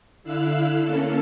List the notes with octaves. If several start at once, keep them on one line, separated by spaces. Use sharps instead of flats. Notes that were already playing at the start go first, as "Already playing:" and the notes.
D3 E4 F5 E6 F#6
A#3 C#4 A4